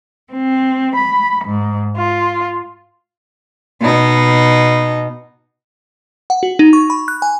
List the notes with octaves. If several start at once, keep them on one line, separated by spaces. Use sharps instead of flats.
C4
B5
G#2
F4
B2 D#4
F#5
F#4
D#4
C#6
B5
F#6
G#5